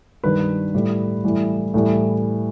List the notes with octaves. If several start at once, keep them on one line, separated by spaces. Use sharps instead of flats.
G2 D#3 G3 B4
A2 G3
A2 E3 G3
A2 E3 G3